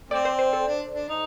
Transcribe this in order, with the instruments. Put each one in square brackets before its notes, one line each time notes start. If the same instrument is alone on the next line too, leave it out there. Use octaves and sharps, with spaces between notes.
[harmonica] A3 C4 [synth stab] D5
[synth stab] C5
C5
A4
[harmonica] D4
D4
D#4